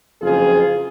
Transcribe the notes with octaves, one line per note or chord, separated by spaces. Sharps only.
F#1 F2 F4 G#4